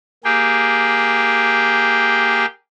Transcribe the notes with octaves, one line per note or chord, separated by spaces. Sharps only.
A#3 G4 G#4 G5